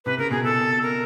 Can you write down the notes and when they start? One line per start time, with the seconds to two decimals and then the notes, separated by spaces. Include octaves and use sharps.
0.05 C3 B4
0.18 C#3 A#4
0.31 B2 G#4
0.44 A4
0.83 A#4